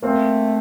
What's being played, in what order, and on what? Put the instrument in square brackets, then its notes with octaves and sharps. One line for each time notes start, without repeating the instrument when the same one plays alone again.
[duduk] A3 [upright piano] A#3 C4